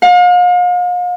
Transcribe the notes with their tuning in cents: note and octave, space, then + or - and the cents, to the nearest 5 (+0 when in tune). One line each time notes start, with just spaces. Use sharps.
F5 +40